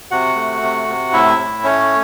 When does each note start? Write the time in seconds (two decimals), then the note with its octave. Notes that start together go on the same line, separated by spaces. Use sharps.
0.11 C3 F#4 F#5
0.36 A3
0.62 C3
0.88 C3
1.13 A2 E4 E5
1.38 A2
1.64 A3 C#4 C#5